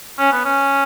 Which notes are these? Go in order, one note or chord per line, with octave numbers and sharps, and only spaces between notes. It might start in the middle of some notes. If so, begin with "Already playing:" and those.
C#4
B3
C#4